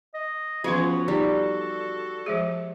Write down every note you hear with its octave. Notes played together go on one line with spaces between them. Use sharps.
D#5
E3 F3 B3 C#4 F#4 G#4 F5 C6
G3 D#4 A4
F3 G#3 G#4